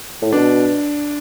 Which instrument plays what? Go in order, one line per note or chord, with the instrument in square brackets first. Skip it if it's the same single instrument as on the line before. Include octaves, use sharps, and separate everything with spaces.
[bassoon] A2
[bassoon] B2 [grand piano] D4